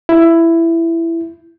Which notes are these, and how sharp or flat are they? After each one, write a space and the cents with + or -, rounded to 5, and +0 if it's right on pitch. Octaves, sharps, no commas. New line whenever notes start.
E4 +10